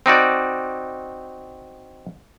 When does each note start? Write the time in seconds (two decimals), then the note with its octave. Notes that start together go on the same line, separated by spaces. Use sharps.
0.06 C4 D#4 F#4 D5